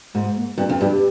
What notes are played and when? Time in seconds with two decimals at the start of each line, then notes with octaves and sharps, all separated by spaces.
0.14 G#2 G#3
0.36 A#3
0.58 G2 C4
0.69 F2 C#4
0.80 G2 G4
0.91 G4